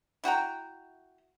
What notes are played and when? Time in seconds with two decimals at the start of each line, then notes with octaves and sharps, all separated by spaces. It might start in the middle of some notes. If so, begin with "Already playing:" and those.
0.24 E4 F#4 G5 A#5